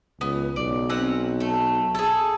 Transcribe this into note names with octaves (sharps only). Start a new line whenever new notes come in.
C#2 B3
B1 D5
C4 C#4 F#5
A3
G#4 A4